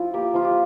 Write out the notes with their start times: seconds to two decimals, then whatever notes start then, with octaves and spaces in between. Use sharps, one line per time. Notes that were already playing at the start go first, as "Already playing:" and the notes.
Already playing: F3 E4 F4
0.13 A#3 G4
0.34 F3 F4
0.44 G4